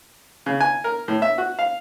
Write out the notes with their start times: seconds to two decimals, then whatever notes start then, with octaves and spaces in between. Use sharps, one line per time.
0.46 C#3
0.60 G#5
0.84 A#4
1.08 A2
1.22 E5
1.38 F#4
1.59 F5